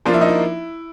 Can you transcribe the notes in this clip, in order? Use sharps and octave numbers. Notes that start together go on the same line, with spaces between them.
F3 A#3 D4 F4
E4
D#4
E4